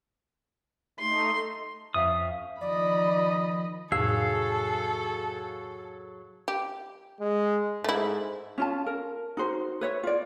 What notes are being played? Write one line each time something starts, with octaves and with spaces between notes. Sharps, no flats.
A3 D#4 C6
F2 C#4 E5 F5 D#6
D#3 F3 D5 D#5 B5
F2 A2 C3 F#3 G#4 A4 F5 E6
G4
G#3
G#2 A3 E4
C#4 F4 A5
A#4
D#4 F#4 C5
B4 C#5 E5
F4 D5